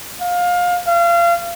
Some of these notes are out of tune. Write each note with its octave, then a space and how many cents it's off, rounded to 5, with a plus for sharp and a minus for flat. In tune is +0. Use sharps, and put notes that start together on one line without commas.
F5 +25
F5 -30